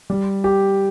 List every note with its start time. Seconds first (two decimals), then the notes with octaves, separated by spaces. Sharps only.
0.10 G3
0.44 G4